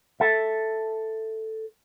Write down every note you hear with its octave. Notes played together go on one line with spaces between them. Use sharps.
A4 E5